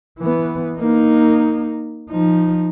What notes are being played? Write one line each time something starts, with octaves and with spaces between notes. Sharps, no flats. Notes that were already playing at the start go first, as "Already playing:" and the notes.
E3 B3
A#3 D#4
F3 D#4